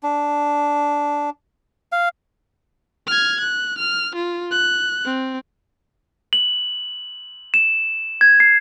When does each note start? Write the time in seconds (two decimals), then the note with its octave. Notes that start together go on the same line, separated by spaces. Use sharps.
0.03 D4
1.92 F5
3.07 F6 G#6
3.40 F#6
3.78 F6
4.15 F4
4.51 F#6
5.06 C4
6.33 F#7
7.54 E7
8.21 G#6
8.40 C7